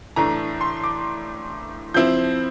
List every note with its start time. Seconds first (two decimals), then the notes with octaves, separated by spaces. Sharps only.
0.16 A2 E3 A3 D4 A#5
0.61 C6
0.84 D6
1.94 F3 C4 E4 G6